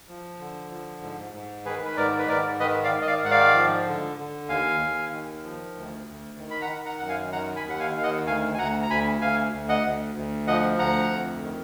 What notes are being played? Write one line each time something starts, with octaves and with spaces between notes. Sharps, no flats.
F3
D3
F3
G#2
G#2
D#3 G#4 B4
B4
G#2 A#4 D5
B4
G#2 A#4 D5
D#3 B4 D#5
D5 F5
D#3
D#5
D5 F5
G#2 F#5
D5 F5
F3
D3
D3
D#2 F5 G#5
D#2
D#3
F3
D2
D2
D#3
B5
F#5 A#5
D#3
F#5 A#5
F#2 F#5
F5 G#5
D#3 F#5 A#5
G#5 B5
D#2
F#5
F5 G#5
D#3 F5
D#5 F#5
D2 F5 G#5
G#5
D2 F#5 A#5
A#5
D2 G#5 B5
D2 F5 G#5
D2
D#5 F#5
D2
D2
F3 D#5 F#5
D2 F#5 A#5
F2
D#3